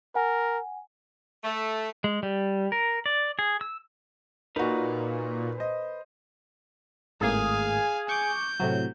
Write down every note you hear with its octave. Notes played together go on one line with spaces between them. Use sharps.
A#4 F#5 G#5
A3
G#3
G3
A#4
D5
G#4
E6
A#2 D#4 F#4 A#4 B4
C5 D#5
G#1 A2 A#3 G#4 F5 G#5
C#6 D6 G6
A2 C3 F#3